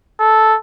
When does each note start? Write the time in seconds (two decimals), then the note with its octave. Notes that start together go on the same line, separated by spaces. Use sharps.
0.20 A4